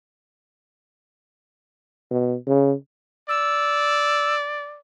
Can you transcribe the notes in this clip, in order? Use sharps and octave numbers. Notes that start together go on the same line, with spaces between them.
B2
C#3
D5 E6